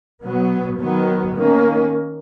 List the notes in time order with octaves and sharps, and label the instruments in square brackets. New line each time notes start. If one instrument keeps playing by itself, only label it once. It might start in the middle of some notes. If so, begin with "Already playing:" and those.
[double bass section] B2 F#3 B3
D#3 F#3 B3
D#3 A#3 C#4